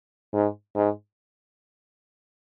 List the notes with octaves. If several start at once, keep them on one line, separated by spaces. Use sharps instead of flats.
G#2
G#2